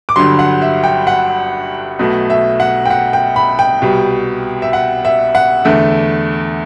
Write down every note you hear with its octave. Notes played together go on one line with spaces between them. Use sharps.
D6
G1 G2 D3 F#3 C6
F#5
E5
G5
F#5
B1 B2 A3
E5
F#5
G5
F#5
G5
B5
G5
C2 B2 G3
E5
F#5
E5
F#5
E2 D3 A3 E5